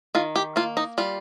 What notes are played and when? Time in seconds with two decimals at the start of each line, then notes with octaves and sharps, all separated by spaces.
0.15 D#3 F4
0.36 G4
0.56 A#3 F4
0.77 D#4
0.98 G3 F4